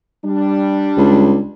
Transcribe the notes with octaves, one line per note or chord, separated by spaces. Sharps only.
G3 D4
C#2